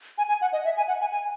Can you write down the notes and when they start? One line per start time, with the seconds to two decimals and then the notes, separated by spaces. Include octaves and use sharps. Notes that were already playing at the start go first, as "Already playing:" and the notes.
0.18 G#5
0.29 G#5
0.41 F#5
0.53 D#5
0.65 E5
0.77 G#5
0.88 F#5
1.01 G#5
1.12 G#5